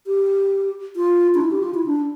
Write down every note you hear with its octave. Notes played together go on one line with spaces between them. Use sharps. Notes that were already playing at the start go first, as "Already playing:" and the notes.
G4
F4
D4
E4
G4
F4
E4
D4